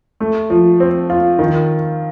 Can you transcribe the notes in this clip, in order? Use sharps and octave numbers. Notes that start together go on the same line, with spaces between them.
A3
F3
C4
F4
D#3